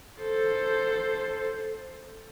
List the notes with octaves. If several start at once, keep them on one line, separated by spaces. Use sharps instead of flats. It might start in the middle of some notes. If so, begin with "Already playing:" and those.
A4 C5